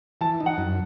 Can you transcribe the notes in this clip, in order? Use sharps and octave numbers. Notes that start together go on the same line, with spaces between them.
E3 A5
D#4
F#5
F#2